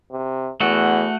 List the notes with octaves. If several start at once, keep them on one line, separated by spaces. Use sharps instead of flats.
C3
E2 A3 F#4